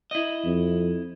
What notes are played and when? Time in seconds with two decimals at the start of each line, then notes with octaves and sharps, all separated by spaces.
0.11 E4 D#5
0.44 F2